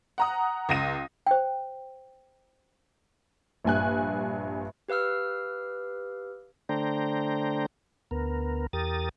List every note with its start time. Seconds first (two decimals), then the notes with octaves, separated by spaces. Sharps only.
0.18 F#5 A#5 D#6
0.69 C#2 A#6 D#7
1.27 C5 G5
3.64 A#1 G2 G#5 F#6
4.89 G4 B4 F5 E6 F6
6.69 D3 A3 D4 C5 G5 A#5
8.11 D2 B3 A#4
8.73 E2 G4 A#4 D#6 A6